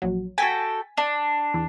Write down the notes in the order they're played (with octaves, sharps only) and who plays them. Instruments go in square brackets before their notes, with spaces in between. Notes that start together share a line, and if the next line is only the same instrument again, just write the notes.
[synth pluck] A#1 F#3
[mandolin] F#4 A4 G5 [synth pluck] G#5 A6 B6
[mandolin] D4
[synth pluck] E2